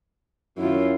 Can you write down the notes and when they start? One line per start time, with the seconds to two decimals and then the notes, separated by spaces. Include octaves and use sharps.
0.58 F#2 E4 F4